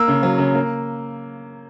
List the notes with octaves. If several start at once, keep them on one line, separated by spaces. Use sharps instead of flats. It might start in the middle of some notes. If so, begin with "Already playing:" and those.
Already playing: A#3 E6
C#3
F#3
C#3
A#3